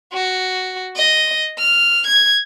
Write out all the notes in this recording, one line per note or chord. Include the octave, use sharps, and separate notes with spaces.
F#4
D#5
F6
G#6